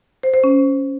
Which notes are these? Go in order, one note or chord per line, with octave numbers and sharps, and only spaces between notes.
C5
C5
C#4